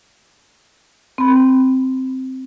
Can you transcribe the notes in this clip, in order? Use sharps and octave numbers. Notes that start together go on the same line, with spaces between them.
C4 B5